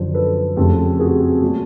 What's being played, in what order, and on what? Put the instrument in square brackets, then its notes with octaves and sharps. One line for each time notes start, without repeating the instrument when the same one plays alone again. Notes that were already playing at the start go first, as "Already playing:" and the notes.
Already playing: [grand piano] F#2 D3 F3 C5
A4 B4
F2 C#3 F3 A3 G4 A4
F#4 G#4
A#2 F#3 A3